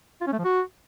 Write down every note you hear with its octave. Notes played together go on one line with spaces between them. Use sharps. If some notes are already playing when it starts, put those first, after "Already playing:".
F4
C#4
A3
F3
F#4